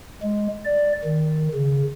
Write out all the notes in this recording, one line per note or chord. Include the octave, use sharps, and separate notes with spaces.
G#3
D5
D#3
C#3